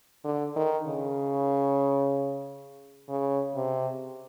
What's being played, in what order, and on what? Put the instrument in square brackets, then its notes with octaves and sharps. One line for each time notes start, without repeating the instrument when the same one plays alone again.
[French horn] D3
D#3
C#3
C#3
C3